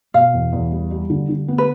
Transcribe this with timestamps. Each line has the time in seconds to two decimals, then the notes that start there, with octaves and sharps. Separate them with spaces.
0.14 B2 F5
0.33 E2
0.52 E2
0.71 G3
0.91 G3
1.10 D3
1.29 D3
1.48 B3
1.58 B4